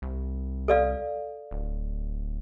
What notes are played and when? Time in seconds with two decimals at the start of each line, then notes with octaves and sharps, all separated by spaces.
0.02 C2
0.68 A4 D5 F5
1.51 D1